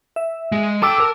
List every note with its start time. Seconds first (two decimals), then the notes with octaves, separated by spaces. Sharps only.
0.16 E5
0.52 G#3
0.82 A4 G5 A5 D6 E6
1.00 A#4